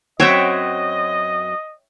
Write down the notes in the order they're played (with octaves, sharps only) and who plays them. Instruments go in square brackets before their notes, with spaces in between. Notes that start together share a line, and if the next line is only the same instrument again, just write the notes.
[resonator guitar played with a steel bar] F#2 F#3 C4 [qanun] C#5 E5 G5 [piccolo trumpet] D#5